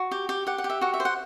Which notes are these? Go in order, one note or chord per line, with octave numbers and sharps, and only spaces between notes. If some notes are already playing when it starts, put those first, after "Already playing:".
Already playing: F#4
G4
G4
G4 F#5
F#5
G4
E5
F#4 F#5
E5
C5
F#5